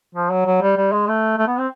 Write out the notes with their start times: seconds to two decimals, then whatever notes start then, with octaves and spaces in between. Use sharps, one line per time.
0.15 F3
0.31 F#3
0.46 F#3
0.62 G3
0.77 G3
0.92 G#3
1.07 A3
1.38 A3
1.47 B3
1.58 C4